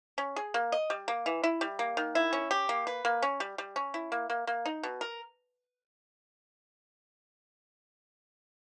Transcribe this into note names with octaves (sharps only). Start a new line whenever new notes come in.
C#4
G#4
A#3
D#5
G3
A#3
E3
E4
G3
A#3
D#3
E4
C#4
G4
A#3
B4
A#3
C#4
G3
G3
C#4
E4
A#3
A#3
A#3
D#4
B2
A#4